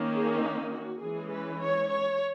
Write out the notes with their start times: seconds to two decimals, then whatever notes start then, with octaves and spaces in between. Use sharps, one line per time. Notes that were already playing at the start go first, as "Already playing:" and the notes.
Already playing: D#3 A#3 C#4
0.12 G#4
0.42 D#4
0.72 F#4
1.01 E3 G#3 C#4 G#4
1.31 B4
1.61 C#5
1.90 C#5